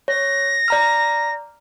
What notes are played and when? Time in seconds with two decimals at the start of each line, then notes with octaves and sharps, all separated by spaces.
0.08 C#5 A#6
0.68 D5 A#5 F6